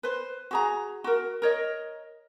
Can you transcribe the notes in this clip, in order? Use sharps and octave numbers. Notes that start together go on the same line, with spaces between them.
B4 C5
F#4 G#4 A#5
F#4 A#4
A#4 C#5 D#5